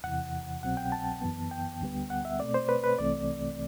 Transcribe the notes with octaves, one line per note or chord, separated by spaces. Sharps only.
E2 C3 E3 F#5
C2 B2 F#3 C4 F#5
G5
A5
F#2 E3 B3
G5
D2 D3 G3 B3
F#5
E5
B2 A3 C4 D5
C5
B4
B4
C2 C3 E3 A3 C4 D5